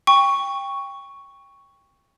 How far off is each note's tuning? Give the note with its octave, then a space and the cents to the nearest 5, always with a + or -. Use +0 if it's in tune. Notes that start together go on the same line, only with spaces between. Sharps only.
G5 +20 C#6 +0